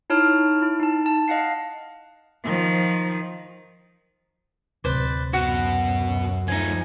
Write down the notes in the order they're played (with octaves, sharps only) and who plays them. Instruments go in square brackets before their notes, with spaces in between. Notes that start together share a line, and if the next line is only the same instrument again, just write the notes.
[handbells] D#4 E4 C#5 A5 F6
E4
D#4 A5
A5
D#5 F5 F#5 C7
[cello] D#3 F3
[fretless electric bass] D1 C3 [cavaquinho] B4 C5 D5
[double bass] F#2 [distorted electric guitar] B2 [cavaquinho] F#4 F#5
[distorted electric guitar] F3 A3 [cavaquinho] D#4 G#5